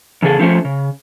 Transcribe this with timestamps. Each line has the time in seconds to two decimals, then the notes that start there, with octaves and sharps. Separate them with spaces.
0.22 E2 C#3 G#4 A4
0.39 D3 F3 A3 C#4 C5
0.65 C#3